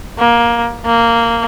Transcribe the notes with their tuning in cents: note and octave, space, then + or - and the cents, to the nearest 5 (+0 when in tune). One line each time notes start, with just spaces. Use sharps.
A#3 +15
A#3 -10